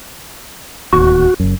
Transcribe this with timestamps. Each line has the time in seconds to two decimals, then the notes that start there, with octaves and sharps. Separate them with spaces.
0.93 D1 D#2 F#4
1.40 F#1 F#2